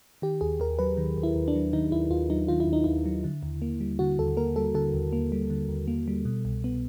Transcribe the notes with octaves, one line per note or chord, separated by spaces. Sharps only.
D#3 G4
D#2 G#4
D#2 A#4
F#3 B4
D#3
D#2
E4
D#2
D4
F#3
D#3 D#4
D#2 E4
D#2 F4
F#3 D#4
D#3 F4
E4
D#2
D#4
D#2 E4
F#3
D3
D#2
A#3
G3
D3 F#4
D#2 A4
A#3 A#4
G3 A4
D3 A4
D#2
A#3
G3
D3
D#2
A#3
G3
B2
C2
B3